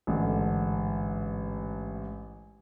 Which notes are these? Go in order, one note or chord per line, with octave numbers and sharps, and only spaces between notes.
A1 G#2 D3